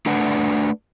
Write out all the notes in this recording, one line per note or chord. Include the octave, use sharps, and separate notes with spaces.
A3 D4 B4 D5 F#5